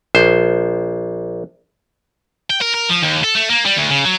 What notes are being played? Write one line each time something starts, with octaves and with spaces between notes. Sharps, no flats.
A#1 C5
G5
A#4
A#4
F3
D#2
A4
A3
A#3
G3
D2
C#3
F#3